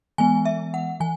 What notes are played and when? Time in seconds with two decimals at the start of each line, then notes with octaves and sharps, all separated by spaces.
0.18 E3 G#3 B3 G#5
0.45 E5
0.74 F#5
1.00 E3 G#5